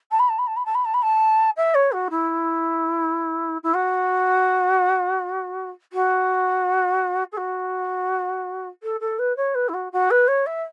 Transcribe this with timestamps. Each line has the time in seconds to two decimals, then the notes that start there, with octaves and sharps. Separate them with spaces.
0.11 A5
0.19 B5
0.29 A5
0.38 B5
0.47 A5
0.56 B5
0.65 A5
0.74 B5
0.85 A5
0.94 B5
1.02 A5
1.56 E5
1.74 C#5
1.92 F#4
2.10 E4
3.63 E4
3.74 F#4
5.92 F#4
7.32 A4
7.37 F#4
8.83 A4
9.00 A4
9.19 B4
9.37 C#5
9.55 B4
9.68 E4
9.73 F#4
9.92 F#4
10.10 B4
10.28 C#5
10.46 E5